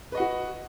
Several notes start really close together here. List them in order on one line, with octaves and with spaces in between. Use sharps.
B4 D#5 F#5 F#4